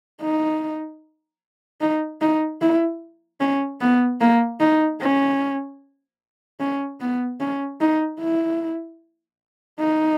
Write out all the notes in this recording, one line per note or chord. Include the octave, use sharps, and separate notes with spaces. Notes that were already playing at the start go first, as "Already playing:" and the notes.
D#4
D#4
D#4
E4
C#4
B3
A#3
D#4
C#4
C#4
B3
C#4
D#4
E4
D#4